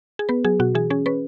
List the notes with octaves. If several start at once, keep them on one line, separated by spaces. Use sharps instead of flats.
G#4
B3 B4
F#3 G#4
B2 F#4
E3 G#4
C#4 G#4
C#4 B4